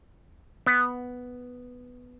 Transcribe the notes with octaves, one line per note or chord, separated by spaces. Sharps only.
B3